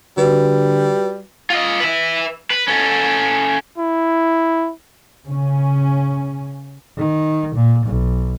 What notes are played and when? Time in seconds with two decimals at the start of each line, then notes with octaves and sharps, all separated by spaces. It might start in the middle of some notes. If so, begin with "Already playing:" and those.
0.17 D3 G3 F#4 B4
1.50 F4 D#5
1.80 B4 E5
2.50 B4
2.68 C#4 A4
3.78 E4
5.26 C#3 C#4
6.98 D#3
7.55 A#2
7.86 B1